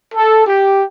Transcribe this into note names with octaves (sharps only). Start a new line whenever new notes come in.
A4
G4